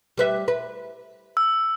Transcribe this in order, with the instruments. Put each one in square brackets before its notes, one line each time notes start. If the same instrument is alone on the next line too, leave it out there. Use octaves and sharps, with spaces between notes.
[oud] G3 B4 E5
B4
[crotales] E6